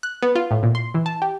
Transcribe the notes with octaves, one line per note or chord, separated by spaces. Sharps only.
F#6
B3
F4
A2
A#2
C6
E3
A5
G4